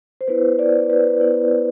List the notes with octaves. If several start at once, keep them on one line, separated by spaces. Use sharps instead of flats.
C5
B3 E4 B4
D5
B4
B3 E4